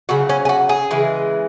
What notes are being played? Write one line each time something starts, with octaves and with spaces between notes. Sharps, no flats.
C#3 F#3 F#4
C#4
G#4
F#4
G#4
C#3 E3 G#3